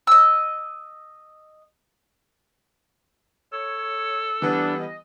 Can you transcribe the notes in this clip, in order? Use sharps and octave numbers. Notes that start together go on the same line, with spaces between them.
D#5 E6
A4 C#5
E3 G3 B3 D4
D#5